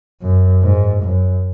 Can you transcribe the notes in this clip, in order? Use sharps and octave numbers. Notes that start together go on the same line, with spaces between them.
F#2
G#2
F#2